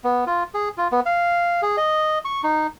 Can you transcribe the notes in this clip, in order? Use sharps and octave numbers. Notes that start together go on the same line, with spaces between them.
B3
F4
G#4
F4
B3
F5
G#4
D#5
C#6
D#4